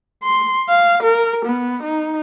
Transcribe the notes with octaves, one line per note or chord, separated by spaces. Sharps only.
C6
F5
A#4
B3
D#4